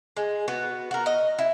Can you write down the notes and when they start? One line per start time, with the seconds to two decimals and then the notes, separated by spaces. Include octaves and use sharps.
0.17 G#3
0.48 B3 F#4
0.91 F#4 A#4
1.06 D#5
1.39 E4